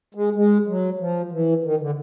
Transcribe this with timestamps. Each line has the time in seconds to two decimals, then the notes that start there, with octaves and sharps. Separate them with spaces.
0.15 G#3
0.36 G#3
0.68 F#3
1.00 F3
1.32 E3
1.64 D#3
1.80 D3